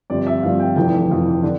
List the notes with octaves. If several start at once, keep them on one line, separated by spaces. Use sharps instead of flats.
G1 G2 F3 C4 D5
E5
G1 G2 F3 C4 F5
G5
F1 F2 E3 G5
F1 F2 E3
D3